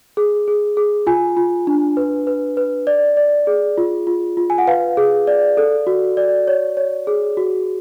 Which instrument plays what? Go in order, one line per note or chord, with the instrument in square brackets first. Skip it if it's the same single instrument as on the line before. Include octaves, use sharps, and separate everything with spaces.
[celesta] G#4
G#4
G#4
F4 G#5
F4
D4
B4
B4
B4
D5
D5
G#4
F4
F4
F4
G#5
F#5
B4 F5
G#4
D5
A4
F#4
D5
C#5
C#5
G#4
F#4